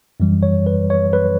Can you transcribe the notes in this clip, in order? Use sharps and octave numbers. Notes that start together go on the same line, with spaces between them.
F#2 E3 G3
C#5
B4
C#5
B4